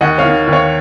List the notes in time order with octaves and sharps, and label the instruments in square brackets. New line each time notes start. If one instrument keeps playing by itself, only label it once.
[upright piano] D#2 D#5 F#5
C#5 F5
D#3
D#2
C#5 F5